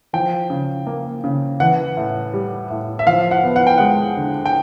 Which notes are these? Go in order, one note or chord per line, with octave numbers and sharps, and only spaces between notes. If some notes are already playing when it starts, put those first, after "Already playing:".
F3 G5
C#3
A#3
C#3
E3 F#5
A2
G3
A2
E5
F3 F5
F#5
B3
F#5
G5
G#3 F#5
D3
G5